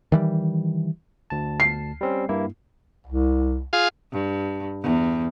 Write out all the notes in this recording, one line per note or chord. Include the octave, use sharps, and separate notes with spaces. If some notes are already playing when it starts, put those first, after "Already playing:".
D#3 E3 G3
D2 A5
C7
G3 C4 C#4
G2 A#3 E4
C2
F4 G#4 F5
G2
E2